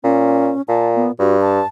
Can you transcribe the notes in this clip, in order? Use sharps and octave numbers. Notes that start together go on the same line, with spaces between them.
A#2 C#4
A#2 A5
B3
G2 F#4
A5